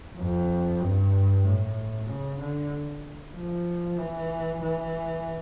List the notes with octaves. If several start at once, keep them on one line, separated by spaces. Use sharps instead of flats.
F2
G2
A2
C#3
D3
F3
E3
E3